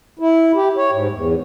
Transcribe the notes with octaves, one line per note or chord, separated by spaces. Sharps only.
E4
G4
C#5
G#2
E2